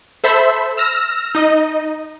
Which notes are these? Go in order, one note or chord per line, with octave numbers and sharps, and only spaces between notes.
A4 C5 E5 B5
E6 F6 A#6
D#4 D#5